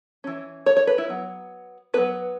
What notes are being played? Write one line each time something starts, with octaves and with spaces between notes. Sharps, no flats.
E3 C#4
C#5
C#5
B4
E4
F#3 B3
F#3 B3 B4